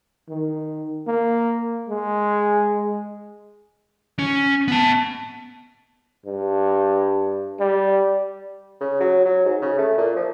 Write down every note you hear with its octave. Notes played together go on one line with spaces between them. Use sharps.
D#3
A#3
G#3
C#4
B3 A5
G2
G3
C#3
F#3
F#3
G#2
C#3
A3
A#2
F3